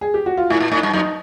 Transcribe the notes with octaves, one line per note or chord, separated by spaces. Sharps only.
G#4
G4
F#4
F4
A2 E4
A#2
A2 D#4
G2
F#2 D#4